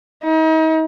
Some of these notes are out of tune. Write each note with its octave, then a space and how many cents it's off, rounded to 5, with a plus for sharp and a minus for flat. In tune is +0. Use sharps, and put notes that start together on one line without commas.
D#4 +40